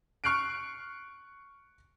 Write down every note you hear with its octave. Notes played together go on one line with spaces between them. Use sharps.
C#6 F6 F#6 C7 D7